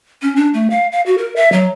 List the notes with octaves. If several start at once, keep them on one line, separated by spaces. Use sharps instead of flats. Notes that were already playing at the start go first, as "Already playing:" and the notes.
C#4
D4
A3
F5
F5
F#4
A#4
E5
F#3